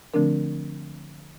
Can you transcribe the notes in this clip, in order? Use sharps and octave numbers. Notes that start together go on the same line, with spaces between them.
D3 F3 A3 C4 D4 A#4